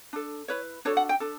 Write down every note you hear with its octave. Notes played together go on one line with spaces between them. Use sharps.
D4 A4
E4 B4 C#5
D4 F#4 A4 C#5
F#5
G5
D4 A4